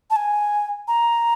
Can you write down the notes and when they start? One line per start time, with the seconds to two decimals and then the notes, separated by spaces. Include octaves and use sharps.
0.10 A5
0.16 G#5
0.88 A#5